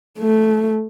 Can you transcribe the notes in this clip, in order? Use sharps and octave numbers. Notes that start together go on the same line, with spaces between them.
A3